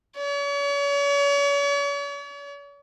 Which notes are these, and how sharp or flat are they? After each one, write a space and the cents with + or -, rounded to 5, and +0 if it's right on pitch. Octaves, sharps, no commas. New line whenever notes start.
C#5 +40